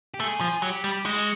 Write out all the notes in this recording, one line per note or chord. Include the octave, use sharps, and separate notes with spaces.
G4
A3 G#4
F3
F#3 G4
G3
G#3 F#4